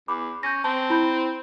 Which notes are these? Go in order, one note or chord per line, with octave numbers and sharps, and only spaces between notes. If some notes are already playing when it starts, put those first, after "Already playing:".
E2 B5 D6
C#4 G6 A#6
C4 A5
E4 B5 G6